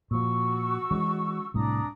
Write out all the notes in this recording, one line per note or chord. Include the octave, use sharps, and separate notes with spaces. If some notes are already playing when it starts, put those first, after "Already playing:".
A#2 F3 F#4 C#6 E6
E3 G#3 C#4
C2 A2 D4 A#5 D#6